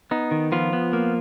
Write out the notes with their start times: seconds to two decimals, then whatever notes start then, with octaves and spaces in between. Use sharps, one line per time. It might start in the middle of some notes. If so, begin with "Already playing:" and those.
0.11 B3 D#4
0.31 D#3
0.52 F3 B3 F4
0.73 B3
0.93 A#3